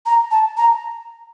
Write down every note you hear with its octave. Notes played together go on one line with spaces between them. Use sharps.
A#5
A5
A#5